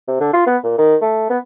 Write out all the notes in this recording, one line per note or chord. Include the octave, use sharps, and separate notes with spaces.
C3
D3
F4
B3
A#2
D#3
A3
B3